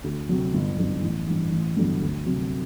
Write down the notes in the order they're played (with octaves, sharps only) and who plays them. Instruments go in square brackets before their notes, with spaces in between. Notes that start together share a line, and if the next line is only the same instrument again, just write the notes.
[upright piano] D2
C3 F#3
G1
F#2 D3
A1
G2 E3
A1
G2 D3 F#3 B3
D2
C3 F#3